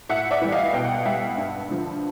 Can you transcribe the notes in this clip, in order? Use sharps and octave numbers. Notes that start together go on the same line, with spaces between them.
A2 E5 F#5
D5 E5
E3 G3
D#5 F5
B2 G5
F#5
F5
G3 E5 F#5
G2
D3 F3